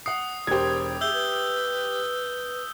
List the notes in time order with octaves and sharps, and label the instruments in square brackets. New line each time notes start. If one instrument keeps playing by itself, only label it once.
[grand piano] F#5 C7 [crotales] D#6
[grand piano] E1 A#4 C5 [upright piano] G4 G#6
[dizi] G#4 [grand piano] E5 [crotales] E6 G6 G7
[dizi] B4